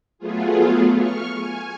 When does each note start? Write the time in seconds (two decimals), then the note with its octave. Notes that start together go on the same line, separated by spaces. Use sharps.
0.19 F#3 A3 B3 F4 G#4
0.95 C#6 F6
1.35 G#5